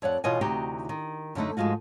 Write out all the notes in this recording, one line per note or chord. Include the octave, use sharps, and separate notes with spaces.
F2 C#5 D5 F#5
B2 E3 F4 C#5 D#5 G#5
D2 C3 E3 D#4 F#4 G4
D#3
F#2 D3 A3 D#4
G#2 F3 G#3 F4 F#4